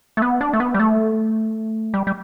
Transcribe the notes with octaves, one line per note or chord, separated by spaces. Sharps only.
A3
B3
D4
A3
B3
G3
A3
G3
G3